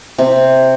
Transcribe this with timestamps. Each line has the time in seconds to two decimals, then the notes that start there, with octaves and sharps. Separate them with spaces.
0.18 C3